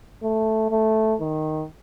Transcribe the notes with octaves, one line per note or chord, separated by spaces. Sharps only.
A3
A3
D#3